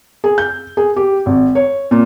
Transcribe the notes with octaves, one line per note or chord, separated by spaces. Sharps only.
G#4
G6
G#4
G4
G#1
C#5
A#2